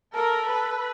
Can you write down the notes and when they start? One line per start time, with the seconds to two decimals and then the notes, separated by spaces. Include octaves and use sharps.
0.15 A4 A#4
0.48 B4